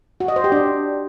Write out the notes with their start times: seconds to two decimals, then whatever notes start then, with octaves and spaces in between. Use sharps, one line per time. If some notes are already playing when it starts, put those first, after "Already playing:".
0.20 F#4
0.28 D#5
0.36 C5
0.44 G4
0.52 D4